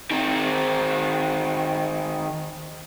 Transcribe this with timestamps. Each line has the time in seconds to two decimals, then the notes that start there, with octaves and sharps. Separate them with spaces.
0.11 D#3 C4